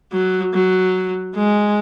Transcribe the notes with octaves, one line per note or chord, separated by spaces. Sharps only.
F#3
F#3
G#3